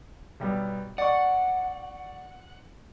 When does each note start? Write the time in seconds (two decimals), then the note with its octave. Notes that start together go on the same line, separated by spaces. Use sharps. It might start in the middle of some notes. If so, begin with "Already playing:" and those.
0.40 B1 G3 B3
0.98 D5 F#5 C#6